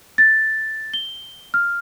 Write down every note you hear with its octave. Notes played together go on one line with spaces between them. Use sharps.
A6
G7
F6